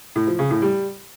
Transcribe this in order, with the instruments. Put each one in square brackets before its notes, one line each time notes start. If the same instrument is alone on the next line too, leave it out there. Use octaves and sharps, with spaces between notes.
[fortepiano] A2
F3
C#3
A2
G3